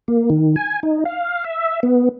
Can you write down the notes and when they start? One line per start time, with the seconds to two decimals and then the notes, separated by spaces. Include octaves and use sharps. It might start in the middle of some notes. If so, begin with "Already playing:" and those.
0.08 A#3
0.30 D#3
0.56 G#5
0.83 D#4
1.05 F5
1.44 E5
1.83 B3